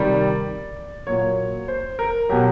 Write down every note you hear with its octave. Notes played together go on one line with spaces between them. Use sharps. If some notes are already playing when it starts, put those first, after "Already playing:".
Already playing: C3 D#3 G3 D5
A#2 F#3 C#5
C5
A#4
B2 F#3 G4